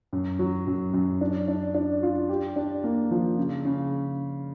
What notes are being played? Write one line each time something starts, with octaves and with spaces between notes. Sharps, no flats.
F#2
F#3
F#2
F#2
D4
D4
D4
F4
G4
D4
A#3
F3
C#3
C#3